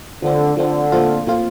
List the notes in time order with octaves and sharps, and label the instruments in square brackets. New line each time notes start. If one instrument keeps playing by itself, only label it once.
[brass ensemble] D3 [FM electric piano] F3 A3 C4
[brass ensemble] D3 [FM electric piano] F3 A3 C4
[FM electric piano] A#2 F3 A3 C4 F4
A#2 F3 A3 C4 F4